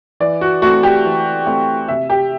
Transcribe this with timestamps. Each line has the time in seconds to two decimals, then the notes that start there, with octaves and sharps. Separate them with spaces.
0.20 E3 D5
0.41 F#4
0.62 A3 C4 F#4
0.83 G4
1.05 E3
1.46 A3 C4
1.88 C3 E5
2.10 G4